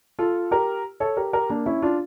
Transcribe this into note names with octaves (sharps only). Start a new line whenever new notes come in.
F4 A4
G4 A#4
A4 C#5
G4 A#4
G4 A#4
A#3 D4
C#4 E4
D4 F4